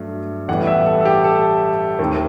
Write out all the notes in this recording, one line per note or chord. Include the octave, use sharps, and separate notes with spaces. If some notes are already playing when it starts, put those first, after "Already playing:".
Already playing: G2 F#3 A3
A1 A2 E3 G3 B3 F#5
E5
A4
A4
G4
A4
D#2 D#3 A3 C4